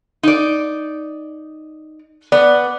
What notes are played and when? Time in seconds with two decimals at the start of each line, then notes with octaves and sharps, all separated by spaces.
0.23 D#4 D5
2.32 B3 D5